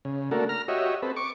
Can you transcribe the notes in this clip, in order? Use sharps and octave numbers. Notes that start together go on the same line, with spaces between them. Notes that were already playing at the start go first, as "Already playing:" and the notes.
C#3
A3 A#3 D4 F#4 A4 A#4
A#5 F6
F#4 G4 C#5 D#5 E5
C4 A4 B4
C#6 D6